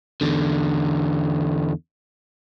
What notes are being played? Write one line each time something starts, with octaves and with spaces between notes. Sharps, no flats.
E2 D3